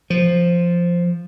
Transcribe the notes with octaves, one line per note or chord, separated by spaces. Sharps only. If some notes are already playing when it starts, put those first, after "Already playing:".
F3